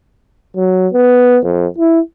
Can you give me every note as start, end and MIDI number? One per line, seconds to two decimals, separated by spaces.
0.56 0.87 54
0.93 1.38 59
1.45 1.66 41
1.78 2.00 64